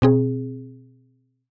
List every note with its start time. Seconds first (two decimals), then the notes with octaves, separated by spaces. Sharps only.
0.02 B2 C4 G#4